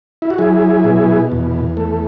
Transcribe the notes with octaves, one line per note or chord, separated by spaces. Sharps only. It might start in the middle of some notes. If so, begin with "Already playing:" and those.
E4
F#4
F#3 E4 G#4
B2
E2
A3